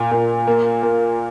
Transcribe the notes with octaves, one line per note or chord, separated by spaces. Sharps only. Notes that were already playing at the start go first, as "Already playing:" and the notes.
Already playing: A#2
A#2
A#3
A#3